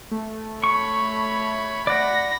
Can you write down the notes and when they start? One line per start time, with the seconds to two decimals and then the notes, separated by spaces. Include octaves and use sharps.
0.11 A3
0.64 C#5 B5 C#6
1.87 D5 F#5 B5 A#6